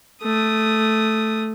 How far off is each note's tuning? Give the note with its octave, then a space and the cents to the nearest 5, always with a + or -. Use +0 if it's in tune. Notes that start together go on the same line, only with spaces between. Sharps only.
A3 +0 D#6 +0